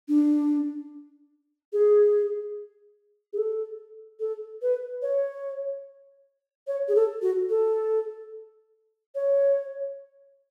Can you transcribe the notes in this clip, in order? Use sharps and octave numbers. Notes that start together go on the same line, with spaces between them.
D4
G#4
G#4
A4
A4
B4
C#5
C#5
G#4
A4
F#4
A4
C#5